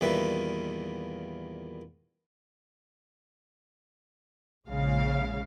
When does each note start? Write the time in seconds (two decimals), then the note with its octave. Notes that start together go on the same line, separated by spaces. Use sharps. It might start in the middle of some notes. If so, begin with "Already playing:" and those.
0.01 E2 A#2 D#3 G3 B4 E5
4.68 A#1 C#3 G#3 F5